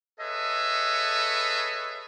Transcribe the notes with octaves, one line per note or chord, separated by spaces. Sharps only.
G#4 A4 B4 C#5 D#5 E5